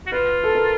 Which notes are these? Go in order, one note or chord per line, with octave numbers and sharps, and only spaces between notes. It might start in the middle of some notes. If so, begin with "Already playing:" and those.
F#4
F4 B4
A4
A#4